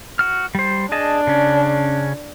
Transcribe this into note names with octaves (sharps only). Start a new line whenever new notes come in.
F#4 F6
G3 C5
D4 G#4 D#5 A5
C#3 C#4